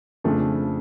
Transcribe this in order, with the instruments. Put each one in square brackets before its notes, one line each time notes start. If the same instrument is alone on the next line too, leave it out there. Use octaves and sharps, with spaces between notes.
[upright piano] F2 C#3 F3 A3 D4